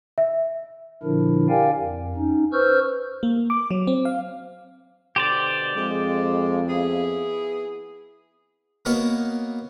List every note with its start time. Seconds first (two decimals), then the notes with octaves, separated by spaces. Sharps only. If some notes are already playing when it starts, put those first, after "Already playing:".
0.18 E5
1.03 A#2 D3 F3 D4 E4 A#4
1.49 G4 A#4 D5 F5 G5 G#5
1.80 F2
2.16 C#4 D#4
2.53 B4 C5 C#6 E6 F6 G6
3.23 A#3
3.50 D6
3.71 F#3
3.87 C4
4.05 F5
5.16 B2 D3 G4 C5 D5
5.76 F2 G#3
6.68 B3 E4 G#4
8.85 A#3 B3 F#4 A#4 C#5 D#5